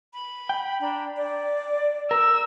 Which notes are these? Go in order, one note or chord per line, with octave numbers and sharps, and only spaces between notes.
B5
G5
D4 A#5 B5
D5
A#4 E6